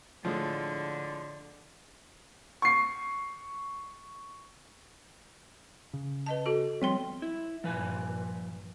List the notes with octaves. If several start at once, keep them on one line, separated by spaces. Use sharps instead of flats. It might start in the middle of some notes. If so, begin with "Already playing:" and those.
A2 D3 F3 G#3
C#6 C7
C#3
B4 D#5 A5
F#4 A4
F3 G3 B3 C4 G5 C6
E4
G2 A#2 F3 B4 G#5